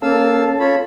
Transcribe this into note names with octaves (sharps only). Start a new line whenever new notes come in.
A#3 C#4 A4 F5 A5 E6
F4 C#5 B5